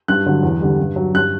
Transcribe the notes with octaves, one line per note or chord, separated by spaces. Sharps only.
G2 F#6
D3 F#3
E2
D3 G3
G2
F#3
G2 F#6